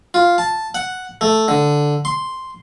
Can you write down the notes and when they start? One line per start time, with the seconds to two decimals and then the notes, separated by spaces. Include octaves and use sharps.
0.14 F4
0.38 A5
0.75 F#5
1.21 A3
1.48 D3
2.05 C6